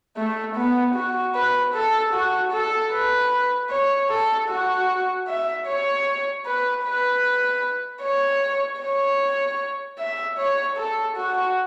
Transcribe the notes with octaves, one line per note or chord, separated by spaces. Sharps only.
A3
B3
F#4
B4
A4
F#4
A4
B4
C#5
A4
F#4
E5
C#5
B4
B4
C#5
C#5
E5
C#5
A4
F#4